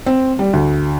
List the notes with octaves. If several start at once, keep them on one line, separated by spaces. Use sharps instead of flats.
C4
G3
D2